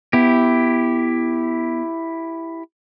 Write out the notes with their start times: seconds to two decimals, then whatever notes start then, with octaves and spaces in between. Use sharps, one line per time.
0.13 B3 E4 G4